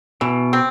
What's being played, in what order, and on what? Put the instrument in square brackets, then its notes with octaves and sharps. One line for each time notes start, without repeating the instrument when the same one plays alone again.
[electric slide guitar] B2 [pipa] E3
[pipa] C4